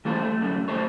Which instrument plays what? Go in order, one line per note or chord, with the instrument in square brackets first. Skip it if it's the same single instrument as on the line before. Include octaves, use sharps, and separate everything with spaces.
[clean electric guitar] E3 G3 A3 F4 A4 C5
A3
F#2 D3 A3
G3 A3 A4 C5 C#5